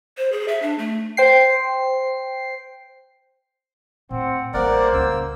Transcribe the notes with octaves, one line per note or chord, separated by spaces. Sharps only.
C5
G#4
E5
D4
A3
C5 G5 C7
A2 C4 F#5
A1 G3 A#3 A#4 C5 D5 F#5
C#2 E6